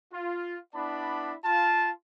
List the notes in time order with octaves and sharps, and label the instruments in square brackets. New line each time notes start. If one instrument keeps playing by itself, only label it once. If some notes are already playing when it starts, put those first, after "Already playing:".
[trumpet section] F4
B3 D4 E4 D5 A5 B5
F4 A5